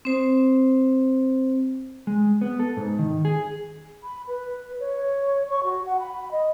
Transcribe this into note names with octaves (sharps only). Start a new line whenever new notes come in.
C4 C5
G#3
B3
A4
G#2
D#3
G#4
B5
B4
C#5
C#6
F#4
F#5
B5
D#5